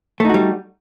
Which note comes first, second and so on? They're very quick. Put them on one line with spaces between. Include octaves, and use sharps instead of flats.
A3 D#4 F#4 G3